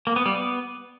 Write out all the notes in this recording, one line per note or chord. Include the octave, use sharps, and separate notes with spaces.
A#3
B3
G3
B3